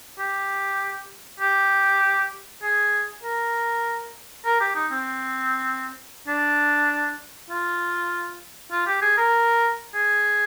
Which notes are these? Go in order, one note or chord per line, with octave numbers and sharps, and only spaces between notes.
G4
G4
G#4
A#4
A#4
G4
D#4
C4
D4
F4
F4
G4
G#4
A#4
G#4